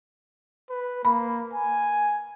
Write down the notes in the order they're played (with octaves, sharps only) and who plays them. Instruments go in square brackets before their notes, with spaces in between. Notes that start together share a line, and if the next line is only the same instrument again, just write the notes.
[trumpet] B4
[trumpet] A#3 [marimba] B5
[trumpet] G#5